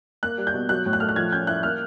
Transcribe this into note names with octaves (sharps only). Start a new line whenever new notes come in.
A#3 F#6
G3
G6
B2
F#3 F#6
A2
F#6
A3 F6
F#6
F3 G#6
C#4 G6
E4 F#6
A#3 F6